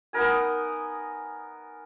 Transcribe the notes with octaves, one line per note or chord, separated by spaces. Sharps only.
B3 D#4 A#4 G#5